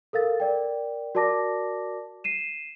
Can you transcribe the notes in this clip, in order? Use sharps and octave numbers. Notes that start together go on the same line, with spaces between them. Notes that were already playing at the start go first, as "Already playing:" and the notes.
A4 A#4 F5 A6
A#4 D5 G5
F#4 A#4 D5 A5 D6 A#6
C7 D#7 E7